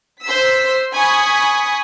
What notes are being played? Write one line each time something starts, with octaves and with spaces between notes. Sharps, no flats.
C5 C6 E6 B6
G#5 B5 C#6 D#6